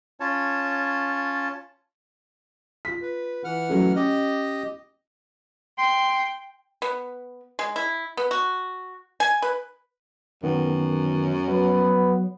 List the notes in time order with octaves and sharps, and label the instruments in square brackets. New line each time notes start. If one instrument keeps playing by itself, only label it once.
[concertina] C#4 F4 C#5 A5
[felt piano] F4 B6
[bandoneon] B4
E3 F#5 F6
[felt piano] F#3 A3 C#4
[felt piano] C#4 [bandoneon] G4 D#5
[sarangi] G5 [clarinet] C6
[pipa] B3
G#3
E4
B3
F#4
G#5
B4
[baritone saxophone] F#2 [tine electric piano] D#3 B3
[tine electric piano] F#3 [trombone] B3